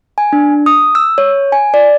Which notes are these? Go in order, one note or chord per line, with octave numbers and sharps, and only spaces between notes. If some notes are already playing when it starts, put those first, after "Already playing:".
G#5
D4
D#6
E6
C#5
G#5
D5